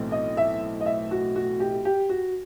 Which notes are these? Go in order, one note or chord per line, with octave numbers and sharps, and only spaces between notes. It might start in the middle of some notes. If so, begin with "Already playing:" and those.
Already playing: B1 A2 E3 A3 C4
D#5
E5
D#5
E5
F#4
F#4
G4
G4
F#4